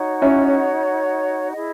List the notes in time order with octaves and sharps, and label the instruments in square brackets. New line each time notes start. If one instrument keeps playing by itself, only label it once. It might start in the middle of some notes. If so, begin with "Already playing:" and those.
Already playing: [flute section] D#4 F#4 C#5 F#5
[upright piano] C#4 E4
[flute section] E4 G#4 D#5